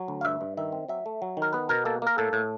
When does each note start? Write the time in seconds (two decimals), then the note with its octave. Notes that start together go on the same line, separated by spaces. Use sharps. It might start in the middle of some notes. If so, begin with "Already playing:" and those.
Already playing: F#3
0.08 D2
0.21 F5
0.25 G2 E5
0.41 G2
0.57 D#3 E5
0.72 C4
0.88 F#3 E5
1.06 A3
1.22 F#3
1.37 D#3
1.42 A#4
1.53 B3 B4
1.69 B2 A#4
1.85 A#3 A4
2.02 A#3 A#4
2.18 A2 A4
2.33 A2